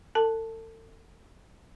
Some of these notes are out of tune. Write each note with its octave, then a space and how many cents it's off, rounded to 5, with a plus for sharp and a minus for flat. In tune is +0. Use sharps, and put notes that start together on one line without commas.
A4 +40 A5 +0